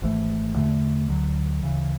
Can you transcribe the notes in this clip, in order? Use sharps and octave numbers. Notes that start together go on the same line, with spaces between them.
G#1 G#2 E3 A3
E2 D3 A3
D2 D3 F#3
D2 C#3 E3